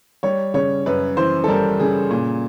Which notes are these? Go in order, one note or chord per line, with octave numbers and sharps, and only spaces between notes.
G3 C#5
C#3 C#5
F#2 B4
E3 C5
A4
G3 A#4
C#3 G#4
A#2